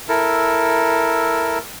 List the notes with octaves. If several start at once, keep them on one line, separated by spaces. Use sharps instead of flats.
E4 A4 A#4